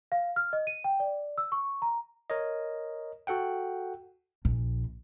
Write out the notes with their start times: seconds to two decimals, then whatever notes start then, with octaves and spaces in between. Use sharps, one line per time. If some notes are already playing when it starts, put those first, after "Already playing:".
0.12 F5
0.36 F6
0.53 D#5
0.67 D#7
0.84 G5
1.00 D5
1.38 E6
1.52 C#6
1.82 A#5
2.30 A#4 C#5 D#5
3.27 F#4 A4 F#5 G5
4.45 A#1